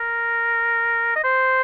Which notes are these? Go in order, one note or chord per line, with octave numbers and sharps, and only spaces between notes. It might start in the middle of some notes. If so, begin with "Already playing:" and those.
Already playing: A#4
D#5
C5